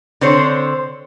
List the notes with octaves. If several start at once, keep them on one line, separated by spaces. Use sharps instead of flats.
D3 C4 C5 C#5